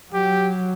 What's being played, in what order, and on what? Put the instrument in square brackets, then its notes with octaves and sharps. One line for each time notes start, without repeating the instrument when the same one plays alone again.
[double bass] F#3 [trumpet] G4